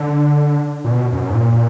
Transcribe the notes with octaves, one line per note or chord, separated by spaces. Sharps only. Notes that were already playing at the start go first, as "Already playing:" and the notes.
Already playing: D3
A#2
B2
F#2
G#2
A#2